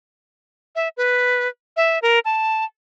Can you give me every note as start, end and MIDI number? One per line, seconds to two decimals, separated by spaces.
0.76 0.89 76
0.97 1.48 71
1.77 1.99 76
2.02 2.19 70
2.25 2.65 81